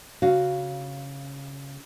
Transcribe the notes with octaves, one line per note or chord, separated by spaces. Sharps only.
C#3 F#4 F5